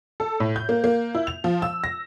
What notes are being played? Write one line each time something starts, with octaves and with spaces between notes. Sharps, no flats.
A4
A2
G6
A#3
A#3
E4
F7
F3
E6
A#6